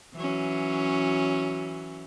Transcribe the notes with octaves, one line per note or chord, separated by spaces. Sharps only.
E3 F#3 C#4